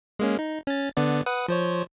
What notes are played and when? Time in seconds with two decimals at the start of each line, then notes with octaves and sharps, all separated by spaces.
0.19 G#3 A#3 C#4
0.39 D#4
0.67 C#4 A6
0.97 D3 B3 D5
1.26 B4 F#5 D#6
1.48 F3 C5 C#5